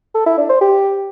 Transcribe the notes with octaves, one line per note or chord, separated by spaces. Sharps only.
A4
E4
D4
C5
G4